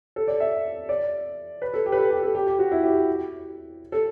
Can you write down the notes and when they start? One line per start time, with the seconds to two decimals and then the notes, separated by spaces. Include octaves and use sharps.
0.16 A4
0.28 D5
0.40 E5
0.89 D5
1.62 B4
1.74 A4
1.86 G4
1.92 B4
1.98 A4
2.10 G4
2.23 A4
2.35 G4
2.47 G4
2.59 F#4
2.71 E4
2.83 G4
3.92 A4